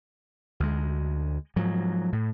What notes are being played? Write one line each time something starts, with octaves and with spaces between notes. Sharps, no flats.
D2 G#3
G#2 F3 F#3
A2